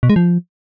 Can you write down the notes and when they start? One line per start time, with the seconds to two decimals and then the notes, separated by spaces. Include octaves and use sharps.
0.03 B2
0.09 G#3
0.16 F3